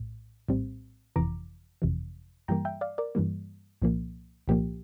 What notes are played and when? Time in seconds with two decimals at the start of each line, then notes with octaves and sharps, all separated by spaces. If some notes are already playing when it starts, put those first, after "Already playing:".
Already playing: A#1 A2
0.49 A#1 A2 G3 C4
1.16 G1 F2 C3 E3 A#5 D6
1.82 G1 F2 C3 E3
2.48 G2 E3 G3 A#3 G5 A#5
2.65 E5 G5
2.81 D5 F5
2.98 A#4 D5
3.15 G2 E3 G3 A#3
3.82 C2 A#2 F3 A#3
4.48 C2 A#2 F3 A#3 G4